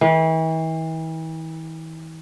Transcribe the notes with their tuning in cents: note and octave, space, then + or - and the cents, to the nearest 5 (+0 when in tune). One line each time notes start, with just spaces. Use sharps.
E3 -40